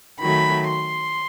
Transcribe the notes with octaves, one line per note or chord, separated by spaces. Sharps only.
D#3 F#3 A3 B5
C6